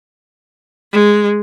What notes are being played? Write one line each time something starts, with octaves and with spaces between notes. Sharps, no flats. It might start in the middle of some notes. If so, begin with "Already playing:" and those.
G#3